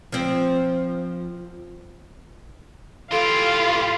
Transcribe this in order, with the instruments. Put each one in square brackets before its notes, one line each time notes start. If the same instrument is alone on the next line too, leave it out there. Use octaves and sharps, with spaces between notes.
[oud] F3 C4
[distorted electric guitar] E3 G4 [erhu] F4 [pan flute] A4 [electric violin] F5